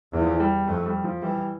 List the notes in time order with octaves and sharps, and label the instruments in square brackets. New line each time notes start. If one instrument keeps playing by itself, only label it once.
[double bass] E2 [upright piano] E3
[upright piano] F3
E3
G3
[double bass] F2 [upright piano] A3
[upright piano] G3
F3
[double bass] E3 [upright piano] G3